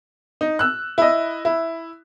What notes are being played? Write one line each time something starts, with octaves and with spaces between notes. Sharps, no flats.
D#4
E6 F#6
E4 D#5
E4